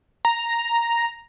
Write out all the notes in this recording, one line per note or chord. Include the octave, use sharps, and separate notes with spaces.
A#5